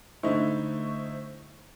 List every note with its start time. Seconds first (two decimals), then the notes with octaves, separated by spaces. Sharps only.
0.23 D3 A3 D#4 E4 C5 C#6